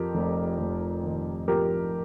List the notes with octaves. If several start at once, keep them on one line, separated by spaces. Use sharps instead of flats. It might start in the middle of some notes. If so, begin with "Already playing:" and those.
Already playing: F2 G4 A#4
F1
F1
D#3
F2 G4 A#4